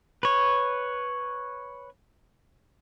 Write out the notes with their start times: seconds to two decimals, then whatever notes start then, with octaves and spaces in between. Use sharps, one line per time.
0.23 B4 C#5